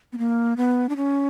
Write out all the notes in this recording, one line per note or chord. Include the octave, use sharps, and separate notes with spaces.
B3
A#3
B3
D4
C#4